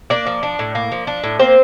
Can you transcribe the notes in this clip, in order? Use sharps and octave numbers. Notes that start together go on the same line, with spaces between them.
A#3 D4 D5
F3
D4
A2
A#3
F3
D4
A2
A#3 C4 C5